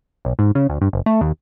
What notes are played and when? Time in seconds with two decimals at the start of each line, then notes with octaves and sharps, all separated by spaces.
0.25 B1
0.39 G#2
0.55 C#3
0.69 D2
0.81 G2
0.93 F#1
1.06 A3
1.21 D#2